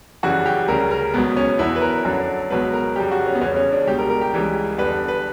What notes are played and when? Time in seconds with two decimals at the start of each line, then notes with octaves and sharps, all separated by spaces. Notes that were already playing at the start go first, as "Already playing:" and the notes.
0.23 F#2 C#3 E3 G3 F#4
0.46 G4
0.68 D2 C#3 G3 A#4
0.91 A#4
1.14 C#2 B2 F#3 B3
1.37 C#4
1.59 E2 B2 F#3 E4
1.76 B4
1.82 A#4
2.05 F#2 D3 F#3
2.50 C#2 B2 F#3 B4
2.73 A#4
2.96 F#2 C#3 G3 G4
3.11 F#4
3.26 C#4
3.35 B3
3.41 E2 C#3 G3 C#4
3.56 C#4
3.72 D4
3.87 C#2 B2 G3 G4
3.99 A#4
4.10 A#4
4.21 G4
4.33 C#2 C#3 E3 G3
4.78 E2 D3 G3 B4
5.08 B4